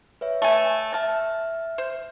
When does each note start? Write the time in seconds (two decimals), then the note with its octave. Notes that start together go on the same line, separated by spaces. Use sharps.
0.21 B4 C#5 E5
0.42 A3 G#5
0.94 E5 A5 F6
1.78 C5